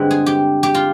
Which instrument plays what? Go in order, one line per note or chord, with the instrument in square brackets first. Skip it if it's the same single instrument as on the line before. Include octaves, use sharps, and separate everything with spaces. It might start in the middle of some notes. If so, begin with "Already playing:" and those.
Already playing: [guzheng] G2 D3 G#3 C4 B4
G#4
G4
G4
F4